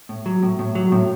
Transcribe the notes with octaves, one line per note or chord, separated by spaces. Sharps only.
A2
F#3
A2
A2
F#3
A2